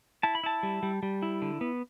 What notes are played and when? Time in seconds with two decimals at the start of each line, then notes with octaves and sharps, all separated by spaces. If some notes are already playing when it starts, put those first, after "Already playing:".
0.23 E4 A5
0.35 B5
0.44 E4 A5
0.63 G3
0.83 G3
1.03 G3
1.22 E4
1.42 D3
1.61 B3